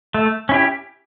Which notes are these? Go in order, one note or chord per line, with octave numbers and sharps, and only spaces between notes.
A3
C#4 E4 G4